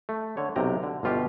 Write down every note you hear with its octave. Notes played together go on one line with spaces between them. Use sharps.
A3
D3 C#5
B1 C3 G5 A#5
D3
G1 B2 F4 G4 F5